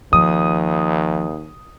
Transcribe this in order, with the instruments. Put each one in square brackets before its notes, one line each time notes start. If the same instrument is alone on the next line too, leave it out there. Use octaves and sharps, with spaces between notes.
[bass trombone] D#2 [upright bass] F3 [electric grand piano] D#6